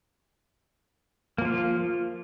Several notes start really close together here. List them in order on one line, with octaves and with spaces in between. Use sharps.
A#3 F3 F4